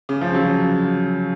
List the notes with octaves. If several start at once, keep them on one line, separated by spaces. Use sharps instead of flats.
C#3
F3
F#3